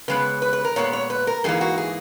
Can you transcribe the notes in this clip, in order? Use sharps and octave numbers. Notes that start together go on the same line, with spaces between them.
C#3 G#3 B3 B4
B4
B4
A#4
A#2 G#3 B3 C#5
C#5
B4
A#4
G#2 E3 A#3 G#4
F#4
G#4